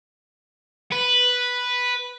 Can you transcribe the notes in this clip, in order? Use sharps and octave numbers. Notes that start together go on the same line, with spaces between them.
B4